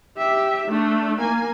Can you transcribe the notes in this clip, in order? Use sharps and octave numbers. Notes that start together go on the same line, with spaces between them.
G4 E5
A3 D4
A#3 G#5